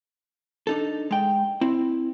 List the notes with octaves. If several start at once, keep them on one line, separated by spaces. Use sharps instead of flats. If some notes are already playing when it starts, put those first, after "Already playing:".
D4 D#4 A4
G#3 G5
C4 E4